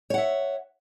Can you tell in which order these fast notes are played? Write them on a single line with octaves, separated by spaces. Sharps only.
C#5 F#5 E5